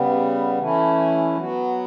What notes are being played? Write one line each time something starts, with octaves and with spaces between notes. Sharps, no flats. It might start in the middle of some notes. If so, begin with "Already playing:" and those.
Already playing: C#3 G3 B3
E3 A3 C#4 E4
F#3 B3 F#4